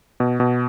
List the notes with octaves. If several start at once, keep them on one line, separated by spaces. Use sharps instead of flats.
B2
B2